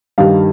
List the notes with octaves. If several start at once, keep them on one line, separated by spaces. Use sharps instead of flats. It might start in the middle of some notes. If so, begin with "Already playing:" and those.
G2 D#3 G3 F5